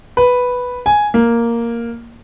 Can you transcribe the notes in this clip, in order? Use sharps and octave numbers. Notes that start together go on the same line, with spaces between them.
B4
G#5
A#3